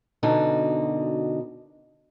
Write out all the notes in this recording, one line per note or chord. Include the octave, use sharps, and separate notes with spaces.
F#2 B2 D3 D#4 F#4